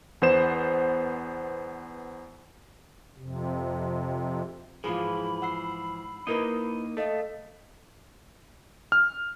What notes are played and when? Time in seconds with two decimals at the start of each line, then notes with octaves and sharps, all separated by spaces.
0.22 E2 B3 C5 E7
3.17 F2 C3
4.84 G#2 E3 F3 F4 G#4 B5
5.42 F#5 E6 C7
6.27 A#3 D#4 E4 A#4 B4 D#5
6.97 A3 A4 D#5 F5
8.92 F6